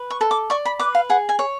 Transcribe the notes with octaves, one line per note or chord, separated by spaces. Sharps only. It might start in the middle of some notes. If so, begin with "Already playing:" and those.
Already playing: B4
C#6
A4
D6
D5 C#6
B5
B4 D6
F5
G#4 F#5
G#5
C#5